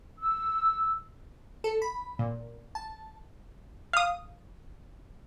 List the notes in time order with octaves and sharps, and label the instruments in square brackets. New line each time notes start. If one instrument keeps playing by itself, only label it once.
[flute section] E6
[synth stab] A4
B5
A#2
A5
[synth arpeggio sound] F5 D#6